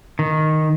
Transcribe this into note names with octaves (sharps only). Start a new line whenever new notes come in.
D#3